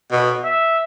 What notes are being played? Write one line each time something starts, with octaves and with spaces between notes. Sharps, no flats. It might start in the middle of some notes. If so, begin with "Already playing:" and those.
B2
E5